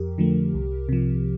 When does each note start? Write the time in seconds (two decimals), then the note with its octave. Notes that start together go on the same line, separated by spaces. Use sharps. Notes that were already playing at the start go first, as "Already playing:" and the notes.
Already playing: F2 G4 A#4
0.18 D3 F3 A3
0.54 C2
0.89 C3 F3